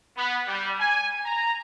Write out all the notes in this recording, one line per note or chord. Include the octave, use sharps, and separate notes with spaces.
B3
G3
G#5
A#5